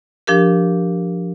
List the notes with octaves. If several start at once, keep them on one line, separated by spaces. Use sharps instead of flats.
F3 D4 G4 A#4